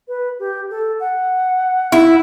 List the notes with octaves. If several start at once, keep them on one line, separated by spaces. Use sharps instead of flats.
B4
G4
A4
F#5
E4